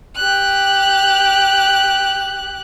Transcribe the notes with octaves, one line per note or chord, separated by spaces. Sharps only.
G4 F#6